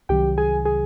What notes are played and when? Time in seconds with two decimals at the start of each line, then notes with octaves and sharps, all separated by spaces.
0.09 C2 C3 D#3 F#3 G4 G5
0.38 G#4 G#5
0.65 G#4 G#5